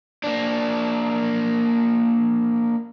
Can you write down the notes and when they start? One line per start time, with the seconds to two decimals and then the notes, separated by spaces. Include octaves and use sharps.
0.24 A#3 D4